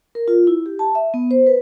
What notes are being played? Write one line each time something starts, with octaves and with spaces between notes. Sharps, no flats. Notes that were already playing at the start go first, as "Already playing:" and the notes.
A#4
F4
E4
G4
A5
E5
B3
C5
B4